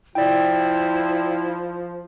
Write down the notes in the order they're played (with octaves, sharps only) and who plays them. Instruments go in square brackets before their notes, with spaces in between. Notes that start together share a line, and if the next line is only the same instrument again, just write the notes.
[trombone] F3 [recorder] E4 [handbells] D5 G5